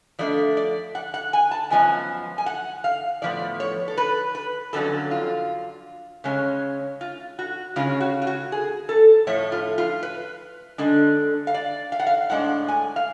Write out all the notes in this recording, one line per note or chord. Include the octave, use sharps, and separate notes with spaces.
F2 F3 A3 D4 D5
D5
F#5
F#5
G#5
A5
F#2 F3 G#3 B3 G#5
G#5
F#5
F5
A2 F3 B3 D5
C#5
A4
B4
B4
F2 D3 F#3 C#4 A4
F4
C#3 G#3 C#4
F4
F#4
C#3 G#3 C#4 F4
F#4
F4
F#4
G#4
A4
A2 F3 A3 C#5
F4
F4
B4
D3 G#3 D4
F5
D5
F5
F#5
F5
A2 G#3 D4 F#5
G#5
F5